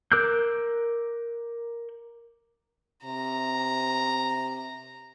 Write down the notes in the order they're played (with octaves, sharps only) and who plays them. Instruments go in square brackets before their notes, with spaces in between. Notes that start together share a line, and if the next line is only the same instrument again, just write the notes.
[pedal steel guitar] A#4 D6 E6 F#6 G6
[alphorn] C3 [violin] A#5